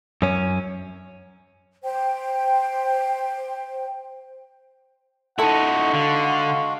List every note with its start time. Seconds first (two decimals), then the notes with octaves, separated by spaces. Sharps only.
0.22 F#2 C#4
1.84 C5 G5
5.39 G#3 D#4 E4 F#4 A4 F#5 C#6
5.93 D3 F5